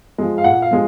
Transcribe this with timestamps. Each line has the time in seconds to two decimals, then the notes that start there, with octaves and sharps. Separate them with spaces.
0.18 F3 G#3
0.38 F5
0.44 A#2 F#5
0.62 F5
0.71 F3 G#3